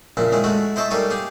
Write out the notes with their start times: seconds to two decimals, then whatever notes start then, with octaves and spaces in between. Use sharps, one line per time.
0.17 A#1 A#2 C#3 E4
0.32 D#3 G#3 C#4 E4
0.44 G#3 A3 E4 F#4
0.76 E4 C5 D#5 E5 A5 C#6
0.90 G3 A#3 D#4 A4 C#5 G#5
1.11 G4 G#4